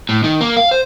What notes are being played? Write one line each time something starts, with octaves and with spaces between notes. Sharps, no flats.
A2
D#3
A#3
F5
C5